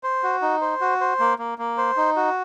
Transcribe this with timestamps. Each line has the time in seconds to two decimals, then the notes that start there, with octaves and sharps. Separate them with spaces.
0.03 C5
0.23 F#4
0.42 D#4
0.61 C5
0.81 F#4
1.01 C5
1.20 A#3
1.39 A#3
1.58 A#3
1.78 C5
1.97 D#4
2.16 F#4